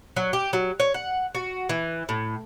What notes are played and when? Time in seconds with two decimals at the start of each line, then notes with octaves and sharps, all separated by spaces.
0.17 F#3
0.33 G4
0.53 F#3
0.80 C#5
0.94 F#5
1.35 F#4
1.69 E3
2.09 A2